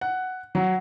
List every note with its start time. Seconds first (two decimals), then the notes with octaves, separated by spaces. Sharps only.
0.01 F#5
0.55 F#3